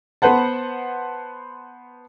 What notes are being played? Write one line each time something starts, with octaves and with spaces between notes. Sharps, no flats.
B3 B4 C5 F#5 A5